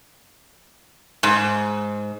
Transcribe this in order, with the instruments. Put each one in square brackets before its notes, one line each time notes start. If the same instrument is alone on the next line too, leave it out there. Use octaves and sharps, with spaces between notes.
[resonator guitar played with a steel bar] G#2